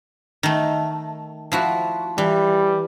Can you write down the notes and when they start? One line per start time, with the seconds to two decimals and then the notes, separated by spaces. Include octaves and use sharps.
0.43 D#3 A3
1.52 F3 E4 F#4
2.18 E3 G3